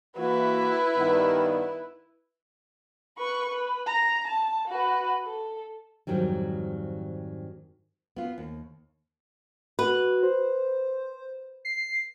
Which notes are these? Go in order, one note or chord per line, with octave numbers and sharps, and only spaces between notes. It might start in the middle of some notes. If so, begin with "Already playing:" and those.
E3 A#3 E4 F#4 B4
G2 D#3 B3
B4 C#6
B4
A#5
A5
F#4 B4
A4
F2 G#2 D#3 F#3 G3
B3 F4
D#2
F#4 B4
C5
C7